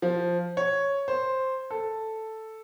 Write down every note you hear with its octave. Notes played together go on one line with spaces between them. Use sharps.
F3
C#5
C5
A4